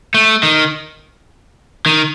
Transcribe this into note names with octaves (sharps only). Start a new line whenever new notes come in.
A3
D#3
D#3